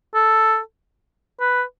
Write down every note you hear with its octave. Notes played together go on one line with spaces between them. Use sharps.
A4
B4